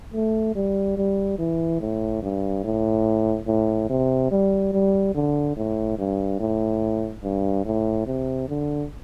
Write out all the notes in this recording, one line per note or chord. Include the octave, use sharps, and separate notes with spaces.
A3
G3
G3
E3
A2
G2
A2
A2
C3
G3
G3
D3
A2
G2
A2
G2
A2
C3
D3